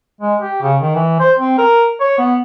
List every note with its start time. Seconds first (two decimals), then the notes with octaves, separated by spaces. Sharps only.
0.21 G#3
0.41 G4
0.62 C#3
0.81 D#3
0.95 E3
1.20 C5
1.39 C4
1.58 A#4
2.00 C#5
2.18 B3